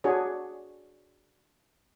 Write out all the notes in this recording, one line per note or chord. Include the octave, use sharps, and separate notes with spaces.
D4 F#4 G#4 C#5